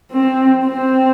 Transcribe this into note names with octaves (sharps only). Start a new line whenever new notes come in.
C4
C4